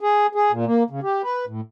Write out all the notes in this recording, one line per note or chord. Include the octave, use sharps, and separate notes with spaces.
G#4
G#4
A#2
A#3
C#3
G4
B4
A2